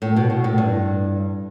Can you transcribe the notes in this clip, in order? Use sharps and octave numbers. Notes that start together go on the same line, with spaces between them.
A2
B2
B2
A2
G2